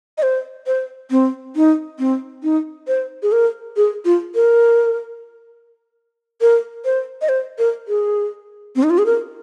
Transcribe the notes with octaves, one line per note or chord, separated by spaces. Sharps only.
D#5
C5
C5
C4
D#4
C4
D#4
C5
G#4
A#4
G#4
F4
A#4
A#4
C5
D#5
C5
A#4
G#4
C4
D#4
F4
G#4
A#4